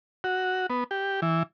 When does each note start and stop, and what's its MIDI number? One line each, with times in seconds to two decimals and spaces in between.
0.24 0.66 66
0.70 0.84 59
0.91 1.20 67
1.22 1.43 52